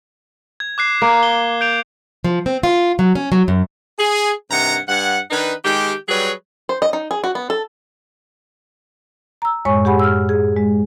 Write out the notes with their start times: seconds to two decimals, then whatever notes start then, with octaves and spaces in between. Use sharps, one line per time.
0.60 G#6
0.78 D6 F#6 C7
1.02 A#3
1.23 G7
1.61 G6 D7 F7
2.24 F3
2.46 C4
2.63 F4
2.99 F#3
3.15 C#4
3.32 F#3
3.48 F#2
3.99 G#4
4.51 G2 C3 D#3 F#5 A#5
4.89 G2 F#5
5.31 D#3 D4 D#4 B4
5.65 D#3 G#3 G4
6.09 F#3 G3 G#4 B4 C#5
6.69 C5
6.82 D#5
6.93 D#4
7.11 G#4
7.24 F#4
7.35 B3
7.50 A4
9.42 A#5 E6
9.65 F#2 A2 G#3 C#5 G#5 C#6
9.85 G4 G#4 F#5 G#5 B5
10.00 E6 F6
10.29 G#4
10.56 G#3